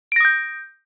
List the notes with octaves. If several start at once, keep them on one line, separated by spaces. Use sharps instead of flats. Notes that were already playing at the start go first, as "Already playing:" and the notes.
D#6 G6 A#6 D7